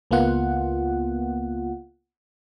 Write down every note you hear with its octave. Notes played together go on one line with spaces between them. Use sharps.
C#2 A#3 B3 F4 F#5